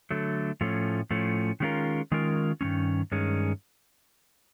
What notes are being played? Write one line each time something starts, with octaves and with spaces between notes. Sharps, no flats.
D3 F#3 A3
A2 F3 A3 C#4
A2 F3 A3 C#4
D#3 G#3 C#4 F4 A#4
D#3 G#3 C#4 F4 A#4
G2 D#3 G#3 C#4
G2 D#3 G#3 C#4